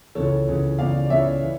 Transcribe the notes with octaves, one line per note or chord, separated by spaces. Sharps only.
C#2 C#3 E3 A4 C#5
C#2 C#3 E3
C#2 C#3 E3 D5 F5
D5
C#2 C#3 E3 C#5 E5
E3